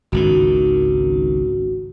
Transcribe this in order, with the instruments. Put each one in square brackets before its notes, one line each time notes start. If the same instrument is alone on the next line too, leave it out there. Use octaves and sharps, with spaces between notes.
[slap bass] G#1 C#2 D#3 [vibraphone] F#4